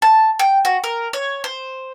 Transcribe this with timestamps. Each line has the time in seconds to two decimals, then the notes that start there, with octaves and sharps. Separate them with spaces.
0.02 A5
0.39 G5
0.65 F#4
0.84 A#4
1.13 C#5
1.44 C5